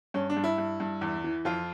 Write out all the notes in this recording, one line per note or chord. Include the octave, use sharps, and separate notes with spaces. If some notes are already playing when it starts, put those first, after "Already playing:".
G2 C#4
D4
G2
E4
G2
G2
E2
E3
F2 F4